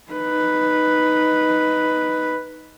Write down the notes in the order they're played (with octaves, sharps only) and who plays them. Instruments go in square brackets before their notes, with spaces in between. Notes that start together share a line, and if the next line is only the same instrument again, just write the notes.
[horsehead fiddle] D#4 B4